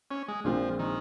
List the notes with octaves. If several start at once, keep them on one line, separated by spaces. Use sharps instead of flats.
C#4
G#3
A#1 A#2 F3 G#3 C4
D#3